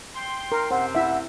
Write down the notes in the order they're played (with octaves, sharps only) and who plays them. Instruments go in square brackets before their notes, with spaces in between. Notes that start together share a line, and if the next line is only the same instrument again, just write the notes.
[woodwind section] G5 C6
[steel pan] A#4
[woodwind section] F#2 C3 C4 [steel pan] C5 [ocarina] F#5
[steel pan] E4 E5 [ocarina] F#5